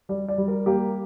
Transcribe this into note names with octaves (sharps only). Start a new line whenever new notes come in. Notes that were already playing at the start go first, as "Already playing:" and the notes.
G3 D5
D5
G3
A#4
A#3 G4